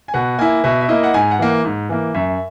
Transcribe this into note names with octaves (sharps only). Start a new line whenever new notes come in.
G#5
B2 F#5
A#3 E4 G#5
B2 E5
E5
A#3 E4 D#5
F#5
G#2 G#5
F#5
E3 A#3
G#2
E3 A#3
F#2 E5